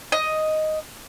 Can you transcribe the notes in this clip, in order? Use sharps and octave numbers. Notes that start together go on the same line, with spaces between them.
D#5